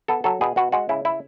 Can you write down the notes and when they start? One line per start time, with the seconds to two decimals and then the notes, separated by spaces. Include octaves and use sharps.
0.08 B3 A4
0.24 F#3 A4
0.41 B2 G#4
0.56 B2 F#4
0.72 G#3 F#4
0.89 C#3 E4
1.05 E4